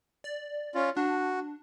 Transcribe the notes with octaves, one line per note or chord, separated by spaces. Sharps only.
D5
C#4 F4
D4 F#4